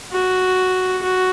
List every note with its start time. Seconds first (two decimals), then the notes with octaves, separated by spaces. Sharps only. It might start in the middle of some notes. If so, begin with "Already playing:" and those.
0.12 F#4
1.02 F#4